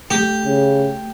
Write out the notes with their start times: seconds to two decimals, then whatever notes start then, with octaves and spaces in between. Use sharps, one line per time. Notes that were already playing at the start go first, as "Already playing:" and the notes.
0.11 A3 G4
0.45 C#3